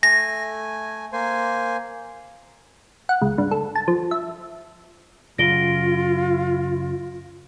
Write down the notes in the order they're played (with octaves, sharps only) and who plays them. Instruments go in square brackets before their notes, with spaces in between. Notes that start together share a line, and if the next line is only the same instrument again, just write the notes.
[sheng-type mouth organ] A3 G#5 [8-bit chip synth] A#6
[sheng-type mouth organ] A#3 C5 G#5
[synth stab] F#5
C#2
G2
A4
A5
F3
E5
[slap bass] F#2 C#3 F#3 [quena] F4 [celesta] A#6 D7 G7